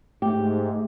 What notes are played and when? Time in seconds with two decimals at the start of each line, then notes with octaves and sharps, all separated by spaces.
0.22 G#2 A3 G4